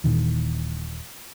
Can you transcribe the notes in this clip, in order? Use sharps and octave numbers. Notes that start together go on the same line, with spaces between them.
D#1 A#2 D#3 E3